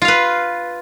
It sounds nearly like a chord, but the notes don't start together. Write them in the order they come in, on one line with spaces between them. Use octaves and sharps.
F4 F5 B4